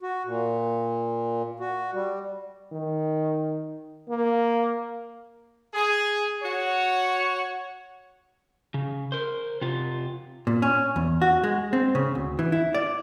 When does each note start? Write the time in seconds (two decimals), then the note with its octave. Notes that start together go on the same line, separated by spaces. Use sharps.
0.03 F#4
0.26 A#2
1.60 F#4
1.94 G3
2.72 D#3
4.09 A#3
5.74 G#4
6.42 F#4 C#5
8.74 C#3
9.12 A#4 C5
9.61 C3 F4
10.47 A#2
10.62 C#4
10.96 E2
11.22 F#4
11.44 G#3
11.73 C4
11.95 C#3
12.15 D2
12.39 E3
12.52 E4
12.75 D5